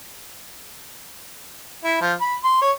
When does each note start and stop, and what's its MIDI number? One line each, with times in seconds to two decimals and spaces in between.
1.84 1.98 64
2.01 2.13 53
2.21 2.35 83
2.44 2.58 84
2.62 2.71 73